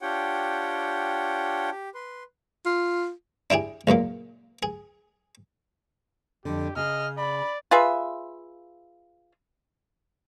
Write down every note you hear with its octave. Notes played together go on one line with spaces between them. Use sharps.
D4 F4 G4 C#5 F#5 G5
G4
B4 C6
F4
D4 E4 G4 G#4
C#2 F#2 A#2 A#3
G#4
F2 D3 G4
C#3 G#4 D#5 F6
D5 B5
F4 G#4 B4 E5